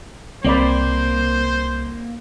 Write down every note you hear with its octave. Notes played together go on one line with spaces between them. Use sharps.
C2 A#3 C4 C5 D5 B5